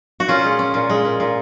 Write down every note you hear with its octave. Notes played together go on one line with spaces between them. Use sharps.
F#4
A#2 C#4 F4
G#3
C#4
A#2
G#3
A#2
A#2